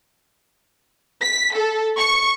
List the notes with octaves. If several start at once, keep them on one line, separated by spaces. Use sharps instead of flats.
B6
A4
C#6